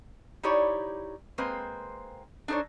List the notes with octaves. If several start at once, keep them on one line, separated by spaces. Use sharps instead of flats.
D#4 E4 G4 C#5 D5
G#3 A#3 C4 B4 C5
D4 D#4 A4 C5 C#5